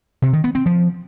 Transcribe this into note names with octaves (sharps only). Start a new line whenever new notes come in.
C3
D#3
B3
C4
F3